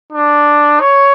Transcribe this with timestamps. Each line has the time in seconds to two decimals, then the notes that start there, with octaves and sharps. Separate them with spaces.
0.12 D4
0.80 C#5